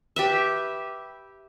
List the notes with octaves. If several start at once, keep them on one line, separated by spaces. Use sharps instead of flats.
G4 B4 E5